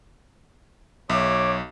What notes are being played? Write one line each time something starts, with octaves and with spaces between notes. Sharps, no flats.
B1 C#5 E5 D6